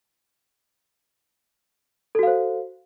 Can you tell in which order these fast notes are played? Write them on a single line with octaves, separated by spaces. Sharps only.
A4 F#4 F5 C5